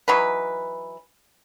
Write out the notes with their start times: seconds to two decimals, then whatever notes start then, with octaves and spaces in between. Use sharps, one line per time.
0.08 E3 F#3 D#4 B4